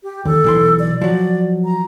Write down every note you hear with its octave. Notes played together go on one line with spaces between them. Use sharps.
G4
D#2 A4
B1 E3 C6
D5
F3 F#3 D5
A#5